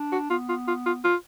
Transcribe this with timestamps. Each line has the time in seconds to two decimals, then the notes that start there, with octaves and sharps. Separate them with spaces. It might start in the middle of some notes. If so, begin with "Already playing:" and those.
Already playing: D4
0.12 F#4
0.30 B3 F4
0.49 F4
0.68 F4
0.86 F4
1.04 F4